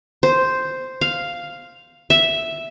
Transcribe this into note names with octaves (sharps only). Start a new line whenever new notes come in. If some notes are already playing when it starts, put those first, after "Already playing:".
C5
F5
E5